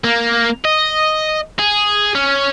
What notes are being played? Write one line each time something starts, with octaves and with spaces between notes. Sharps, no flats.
A#3
D#5
G#4
C#4